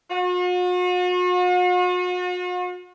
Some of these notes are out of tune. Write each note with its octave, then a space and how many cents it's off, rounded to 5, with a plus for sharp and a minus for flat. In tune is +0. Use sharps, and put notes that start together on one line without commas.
F#4 -45